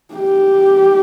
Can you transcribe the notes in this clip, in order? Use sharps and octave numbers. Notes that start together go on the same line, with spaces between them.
G4